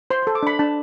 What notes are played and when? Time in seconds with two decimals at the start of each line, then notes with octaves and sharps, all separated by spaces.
0.10 C5 C6
0.23 C6
0.27 A4
0.35 D6
0.43 D4 B5
0.59 D4 A5